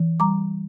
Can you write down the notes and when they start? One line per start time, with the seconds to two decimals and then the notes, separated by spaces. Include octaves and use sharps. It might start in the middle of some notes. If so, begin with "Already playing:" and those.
Already playing: E3
0.20 G3 A#5 D6